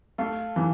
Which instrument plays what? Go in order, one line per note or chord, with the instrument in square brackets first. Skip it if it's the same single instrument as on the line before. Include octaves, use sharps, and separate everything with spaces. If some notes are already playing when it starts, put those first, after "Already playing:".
[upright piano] A3 [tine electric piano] F5
[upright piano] E3